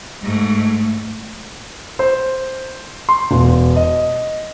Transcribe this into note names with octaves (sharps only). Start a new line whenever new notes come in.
G#2 A3
C5
C6
E1
D#5